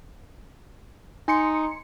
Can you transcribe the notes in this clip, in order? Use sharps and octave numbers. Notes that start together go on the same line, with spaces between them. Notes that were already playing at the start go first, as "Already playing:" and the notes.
D#4 G#5 C6 C#7